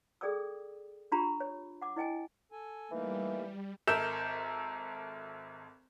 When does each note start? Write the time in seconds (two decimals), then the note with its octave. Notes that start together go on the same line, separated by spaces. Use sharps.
0.21 G#4 A4 D5 G5 D#6 E6
1.12 D4 F4 G4 A#5 B5 C#6
1.40 C#5
1.82 F#5 D6
1.96 E4 D#5 G5 G#5
2.52 A4 G#5
2.91 E3 G3 A3 A#3 D#4
3.87 G#1 A4 A#4 E5 G6 E7